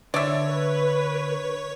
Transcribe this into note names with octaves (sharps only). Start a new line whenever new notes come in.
D3 C#5 D5 E5
B4